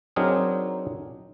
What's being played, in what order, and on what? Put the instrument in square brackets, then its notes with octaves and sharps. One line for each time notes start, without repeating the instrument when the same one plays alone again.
[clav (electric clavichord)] F#3 C4 D4 D#4 G#4 A#4